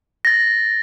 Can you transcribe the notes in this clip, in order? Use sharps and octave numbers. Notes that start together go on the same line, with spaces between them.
A6 A#6